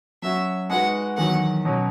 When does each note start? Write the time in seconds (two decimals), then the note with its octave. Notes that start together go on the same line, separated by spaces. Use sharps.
0.22 F#3 C#4 F#4 C#5 E5
0.70 G#3 D#4 F#4 B4 F#5
1.17 E2 D#3 F#3 F#5
1.65 B2 F#3 C#4